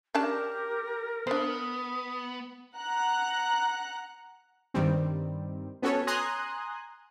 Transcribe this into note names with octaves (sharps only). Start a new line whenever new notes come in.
C#4 D4 G4 A#4 A5
B3 D4 C5 D#6
F#5 A#5 F#6
G2 D#3 G3 C4
B3 C#4 F#4 A4 B4 C#5
G#5 A#5 C6 D#6 F#6 G#6